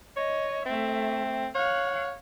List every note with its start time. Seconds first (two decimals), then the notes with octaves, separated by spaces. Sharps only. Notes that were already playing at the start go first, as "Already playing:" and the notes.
0.17 C#5 D#5
0.66 A3 C4 E5
1.55 C#5 F5 F#5